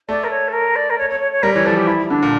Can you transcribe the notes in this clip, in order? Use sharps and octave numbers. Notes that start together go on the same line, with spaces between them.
A3 D5
A#4
C#5
A4
A#4
D5
A#4
C#5
C#5
C#5
C#5
G3 A#4
E3 C#5
F3 A4
G4
E4
E4
D3 D4
A#2